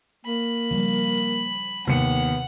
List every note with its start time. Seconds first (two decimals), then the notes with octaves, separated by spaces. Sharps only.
0.26 A#3 B5
0.71 C#3 F3 G3
1.87 D#2 C3 B3 F#5 C#7